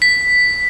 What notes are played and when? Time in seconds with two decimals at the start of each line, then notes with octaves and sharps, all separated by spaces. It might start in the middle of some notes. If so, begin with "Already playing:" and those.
0.02 B6